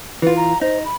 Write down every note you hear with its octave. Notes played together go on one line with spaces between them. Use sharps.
E3 F4 B4
A#5
D#4 C5
B5